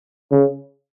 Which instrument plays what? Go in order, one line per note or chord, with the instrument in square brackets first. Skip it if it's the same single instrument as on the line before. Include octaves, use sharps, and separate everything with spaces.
[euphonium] C#3